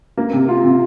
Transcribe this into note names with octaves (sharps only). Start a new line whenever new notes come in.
A#3
C3
F4
C3